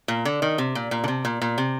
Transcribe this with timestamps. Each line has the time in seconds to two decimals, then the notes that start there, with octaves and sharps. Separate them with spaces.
0.08 A#2
0.25 D3
0.42 D#3
0.58 C3
0.75 A#2
0.91 A#2
1.04 D3
1.08 C3
1.25 A#2
1.42 A#2
1.58 C3